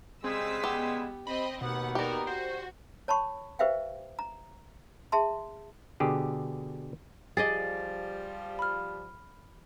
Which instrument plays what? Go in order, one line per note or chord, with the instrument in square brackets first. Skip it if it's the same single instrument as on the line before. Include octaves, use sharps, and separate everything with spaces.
[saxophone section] C#3 G3 G#3 [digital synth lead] C4 [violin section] E6 B6
[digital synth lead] B3 [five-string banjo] G4
[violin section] C4 D#5 [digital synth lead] B5
[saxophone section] D#2 B3 [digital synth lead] B2 [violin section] F#5
[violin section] D#4 F#4 A#4 [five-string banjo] G4 D5
[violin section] F#4 [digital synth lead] C5
[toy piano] C#5 A5 B5 C#6
G4 B4 C5 E5 F5 G5
A#5
G#4 E5 A5 C6
[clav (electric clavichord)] B2 D3 G4 G#4
[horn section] F3 G3 [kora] G#4 D5 D#5 [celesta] A6
[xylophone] B5 F6